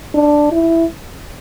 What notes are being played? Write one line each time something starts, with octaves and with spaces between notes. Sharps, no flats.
D4
E4